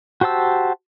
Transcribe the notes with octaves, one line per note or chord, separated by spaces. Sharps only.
F#4 G4 C5 A5 E6